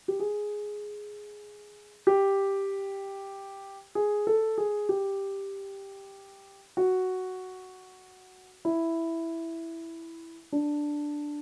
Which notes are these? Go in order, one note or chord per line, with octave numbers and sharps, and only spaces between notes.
G4
G#4
G4
G#4
A4
G#4
G4
F#4
E4
D4